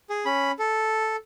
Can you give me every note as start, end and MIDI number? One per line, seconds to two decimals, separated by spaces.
0.10 0.25 68
0.25 0.51 61
0.25 0.51 83
0.59 1.16 69